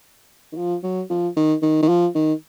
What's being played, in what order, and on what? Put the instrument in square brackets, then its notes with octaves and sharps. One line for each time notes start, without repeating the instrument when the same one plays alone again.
[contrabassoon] D#3
F3
F#3
F3
D#3
D#3
D#3
F3
D#3